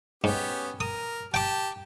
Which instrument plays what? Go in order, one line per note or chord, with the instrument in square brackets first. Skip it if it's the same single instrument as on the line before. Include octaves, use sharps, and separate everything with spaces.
[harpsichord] G#2 [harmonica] B3 C#4 G4
[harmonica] A#4 [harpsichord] D#6
[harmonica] G4 A5 [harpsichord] G5 D6